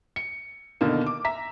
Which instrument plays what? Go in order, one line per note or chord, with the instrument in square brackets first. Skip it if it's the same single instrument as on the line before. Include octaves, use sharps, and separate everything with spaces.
[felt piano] C#7
B2 D3 D#3 A#3
D6
E5 A#5 B6